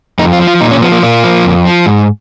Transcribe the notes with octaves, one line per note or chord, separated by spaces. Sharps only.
F2 D#4
F4
F3
F4
A#2 D#4
C#4
F3 B3
A#3
A#2 A#3
F3
F2
F3
G#2